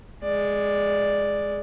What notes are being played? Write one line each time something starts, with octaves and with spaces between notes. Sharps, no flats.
G#3 D5